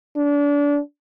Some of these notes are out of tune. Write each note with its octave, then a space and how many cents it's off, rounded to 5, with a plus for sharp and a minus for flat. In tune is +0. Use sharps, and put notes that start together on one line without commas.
D4 -30